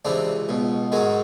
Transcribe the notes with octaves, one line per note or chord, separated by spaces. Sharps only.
C#2 C3 E3 C4 D4
C#2 B2
G#2 D#3 F#3 G#3